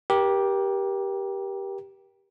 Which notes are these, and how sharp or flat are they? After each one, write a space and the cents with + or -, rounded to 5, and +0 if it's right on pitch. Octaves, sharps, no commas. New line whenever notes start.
G4 +0 A#4 +35